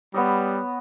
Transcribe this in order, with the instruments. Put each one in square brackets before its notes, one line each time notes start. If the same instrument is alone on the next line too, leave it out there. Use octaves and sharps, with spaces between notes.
[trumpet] G3 [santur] B3 C#5 D#5